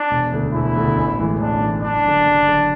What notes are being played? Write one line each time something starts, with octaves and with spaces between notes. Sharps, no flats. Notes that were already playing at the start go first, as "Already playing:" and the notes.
Already playing: D4
E1
D2 D3
E1 E4
D2 D3
A1
A2 E3 G#3
A1 D4
A2 E3 G#3
F#1 D4
F#2 D3
F#1
F#2 D3